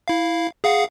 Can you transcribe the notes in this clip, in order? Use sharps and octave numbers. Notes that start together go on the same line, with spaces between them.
E4 F5
G#4 F5 F#5